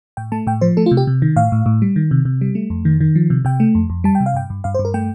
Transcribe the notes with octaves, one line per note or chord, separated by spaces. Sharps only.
A2 G5
A3 A5
A2 G5
F3 C5
A3 A4
F4
C3
G4
C3
D#3
A2 F5
A2
A2
G3
D#3
C3
C3
G3
A3
F2
D#3
D#3
F3
C3
C3 G5
A3
F2
F2
G3 A5
G5
C3
F5
G2 G5
G2
G2 F5
C5
G2
A#4
A3 G5